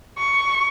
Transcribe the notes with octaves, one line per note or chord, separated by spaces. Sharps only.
C#6